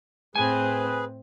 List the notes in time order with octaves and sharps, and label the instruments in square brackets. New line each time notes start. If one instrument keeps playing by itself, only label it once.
[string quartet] A2 C4 C5 [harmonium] G#4 B4 [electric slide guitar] G#5